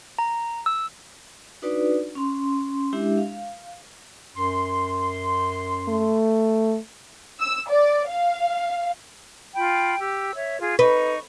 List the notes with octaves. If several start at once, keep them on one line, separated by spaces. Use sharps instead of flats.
A#5
E6
D4 D#4 F#4 B4 D5
C#4 C6
G#3 D4 E4 G4 E5
F5
F#2 C6
A3
E6
D5
F5
F4 G5 B5
G4 E6
C#5 E5
F4 G#4
D#4 B4 C#6